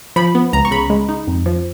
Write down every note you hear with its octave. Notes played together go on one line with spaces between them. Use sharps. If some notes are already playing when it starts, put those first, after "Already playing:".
F3 B5
B3
C#2 A#5
C#6
C#3 B5
G#3
D#4
F2
F3